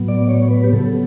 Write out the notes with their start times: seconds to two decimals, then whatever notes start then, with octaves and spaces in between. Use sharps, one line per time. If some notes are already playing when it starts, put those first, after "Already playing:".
Already playing: A2 F#3 B3
0.08 D5
0.29 C#5
0.50 B4
0.64 G4
0.73 C#3 F#3 B3 A4